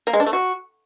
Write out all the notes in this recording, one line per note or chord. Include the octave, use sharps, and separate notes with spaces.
A#3
G#3
D4
A3
F#4